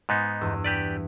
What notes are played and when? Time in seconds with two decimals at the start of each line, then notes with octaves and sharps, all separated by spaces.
0.09 G#2 B3 D#4
0.41 E2 G2 E6
0.64 G4 B4 D5